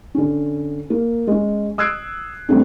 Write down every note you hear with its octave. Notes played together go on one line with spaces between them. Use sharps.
D3 C#4
A#3
G#3 C#4
D#6 E6 F#6 G#6 C7 D7
C#3 G3 A3 C4 D4